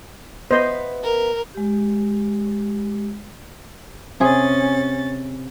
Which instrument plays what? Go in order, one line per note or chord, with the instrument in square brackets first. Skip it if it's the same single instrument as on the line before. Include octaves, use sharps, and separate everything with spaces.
[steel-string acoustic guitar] B3 B4 E5 [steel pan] C5 D#5
[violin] A#4
[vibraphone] G#3 G4
[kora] C3 G#4 [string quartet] C#4 A6